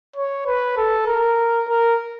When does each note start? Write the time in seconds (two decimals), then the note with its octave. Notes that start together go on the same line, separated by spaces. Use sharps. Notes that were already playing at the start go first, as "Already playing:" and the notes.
0.16 C#5
0.47 B4
0.77 A4
1.07 A#4
1.68 A#4